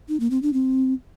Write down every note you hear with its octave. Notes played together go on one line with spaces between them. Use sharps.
D#4
A#3
C4
D4
C4